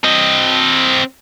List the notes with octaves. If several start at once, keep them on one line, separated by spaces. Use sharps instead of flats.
C4 D#5